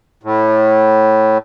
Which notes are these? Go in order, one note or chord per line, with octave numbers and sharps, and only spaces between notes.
A2